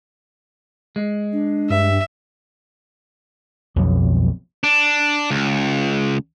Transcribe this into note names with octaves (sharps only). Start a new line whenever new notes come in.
G#3
D4
G2 E5
B1 F2 B2 F#3
D4
C#2